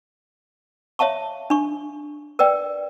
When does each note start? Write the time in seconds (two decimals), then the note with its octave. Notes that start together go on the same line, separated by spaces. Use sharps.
0.99 C#5 E5 F5 A5 C#6
1.50 D4 C#6
2.39 A#4 B4 D5 G5